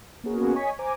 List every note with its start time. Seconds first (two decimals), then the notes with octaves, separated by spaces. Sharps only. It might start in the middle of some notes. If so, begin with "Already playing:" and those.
0.24 A#3 B3 C#4 F#4 G#4 A#4
0.53 C#5 D#5 G#5 C#6 B6
0.79 C5 G#5 A#5 D6